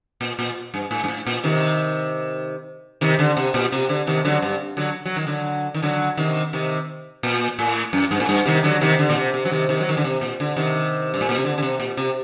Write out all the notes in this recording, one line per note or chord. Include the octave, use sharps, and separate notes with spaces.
A#2
A#2
G2
A2
G2
A2
A#2
C3 D#3
C3 D#3
D3
C3
A#2
C3
D3
C3 D#3
D3 F#3
G2
D3 F#3
F#3
D#3
D3 F#3
D#3
D3 F#3
C3 D#3
C3 D#3
A#2
A2
F#2
G2
A2
G2
C3 D#3
D3 F#3
C3 D#3
D3
A#2
C3
C3
F#3
C3 D#3
C3 D#3
F#3
D#3
D3
C3
A#2
D3
C3 D#3
G2
A2
A#2
C3
D3
D3
C3
A#2
C3